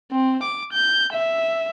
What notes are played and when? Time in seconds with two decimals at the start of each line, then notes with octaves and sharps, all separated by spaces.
0.12 C4
0.43 D6
0.73 G6
1.13 E5